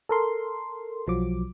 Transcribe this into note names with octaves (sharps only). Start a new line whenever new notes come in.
A4 A#4 C6
B1 F3 F#3 D6